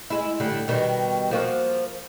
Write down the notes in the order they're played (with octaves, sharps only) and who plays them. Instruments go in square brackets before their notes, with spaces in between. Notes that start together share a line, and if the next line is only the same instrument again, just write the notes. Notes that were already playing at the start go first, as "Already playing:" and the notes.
[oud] G#3 E4
A2 D3 G3
B2 D#3 G3
F3 A#3 F#4